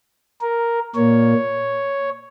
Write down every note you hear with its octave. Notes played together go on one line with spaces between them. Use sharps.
A#4
A#2 A#3 C#5